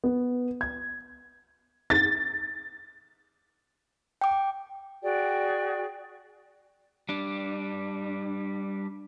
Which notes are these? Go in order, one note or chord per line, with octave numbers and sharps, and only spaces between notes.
B3
G#6
A6
G5 D6
F#4 G#4 D5 G5
G3 D4